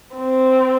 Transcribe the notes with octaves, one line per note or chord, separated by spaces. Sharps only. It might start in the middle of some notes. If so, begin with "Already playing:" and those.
C4